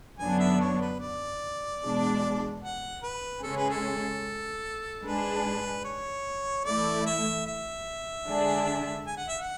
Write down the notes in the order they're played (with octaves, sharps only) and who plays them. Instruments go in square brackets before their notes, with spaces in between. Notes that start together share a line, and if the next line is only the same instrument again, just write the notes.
[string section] F#2 D3 F#3 B3 D4 [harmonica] G#5
[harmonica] E5
C#5
B4
D5
[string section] E2 B2 G#3 D4
[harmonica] F#5
B4
[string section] C#3 G#3 C#4 G#4 [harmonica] A4
[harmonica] B4
A4
[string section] G#2 G#3 D4 G#4 [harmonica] B4
[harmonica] C#5
[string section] E3 A3 E4 [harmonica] D5
[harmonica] E5
E5
[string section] D3 G#3 D4 G#4
[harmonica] G#5
F#5
E5
F#5